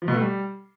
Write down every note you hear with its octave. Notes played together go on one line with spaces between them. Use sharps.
F3
B2
A3
G3